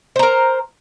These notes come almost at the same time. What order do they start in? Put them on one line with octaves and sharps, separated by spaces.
C5 A#5 A#4